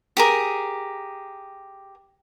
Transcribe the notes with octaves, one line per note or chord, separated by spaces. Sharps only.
G4 G#4 A#4